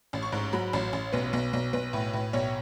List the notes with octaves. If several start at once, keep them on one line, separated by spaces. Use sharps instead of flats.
A1
C#6
G#2
F#3 B5
A1
A1
B1 B4
B1
B1
B1 B4
A2
A2
B1 C#5